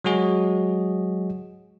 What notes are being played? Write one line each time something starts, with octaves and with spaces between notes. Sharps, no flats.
F#3 G#3 F#4 G#4 D#5